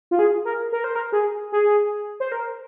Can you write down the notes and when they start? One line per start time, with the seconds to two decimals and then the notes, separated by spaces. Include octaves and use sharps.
0.11 F4
0.19 G#4
0.45 A#4
0.72 A#4
0.84 C5
0.95 A#4
1.12 G#4
1.52 G#4
2.20 C5
2.32 A#4